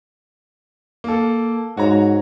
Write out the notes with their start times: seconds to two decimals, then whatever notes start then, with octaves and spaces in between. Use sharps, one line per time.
1.04 A#3 A4
1.77 G#2 F#4 C#5 A#5